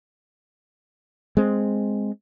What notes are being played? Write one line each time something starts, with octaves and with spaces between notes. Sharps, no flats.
G#3 C4